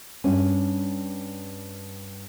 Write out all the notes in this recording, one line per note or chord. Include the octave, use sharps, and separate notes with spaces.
G2 C#4